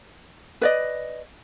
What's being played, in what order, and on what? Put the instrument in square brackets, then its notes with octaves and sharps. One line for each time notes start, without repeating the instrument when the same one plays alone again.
[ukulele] B4 D5 D#5